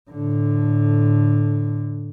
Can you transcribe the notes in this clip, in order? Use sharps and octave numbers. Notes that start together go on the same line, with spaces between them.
A2 D3